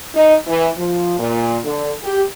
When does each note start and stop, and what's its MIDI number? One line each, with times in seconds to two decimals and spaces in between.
0.14 0.35 63
0.47 0.68 52
0.77 1.14 53
1.18 1.57 46
1.64 1.90 50
2.03 2.22 67